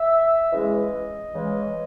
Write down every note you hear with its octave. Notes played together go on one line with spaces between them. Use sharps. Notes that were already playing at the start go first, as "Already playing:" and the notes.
Already playing: E5
C#3 E3 G#3 D#5
C#3 E3 G#3